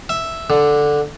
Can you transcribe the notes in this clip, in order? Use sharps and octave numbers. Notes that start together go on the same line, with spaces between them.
E5
D3